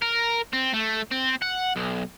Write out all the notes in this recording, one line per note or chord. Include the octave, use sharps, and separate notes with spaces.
A#4
C4
A3
C4
F#5
B1